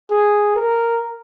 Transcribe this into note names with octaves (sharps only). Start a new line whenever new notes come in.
G#4
A#4